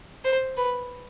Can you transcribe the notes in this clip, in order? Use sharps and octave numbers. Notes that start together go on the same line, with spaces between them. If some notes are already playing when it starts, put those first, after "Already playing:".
C5
B4